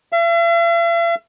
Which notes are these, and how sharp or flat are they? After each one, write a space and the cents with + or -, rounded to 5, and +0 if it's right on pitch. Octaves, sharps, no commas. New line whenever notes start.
E5 +45